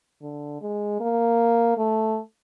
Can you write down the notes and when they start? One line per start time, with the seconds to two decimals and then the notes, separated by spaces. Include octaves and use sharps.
0.22 D3
0.61 G#3
1.00 A#3
1.77 A3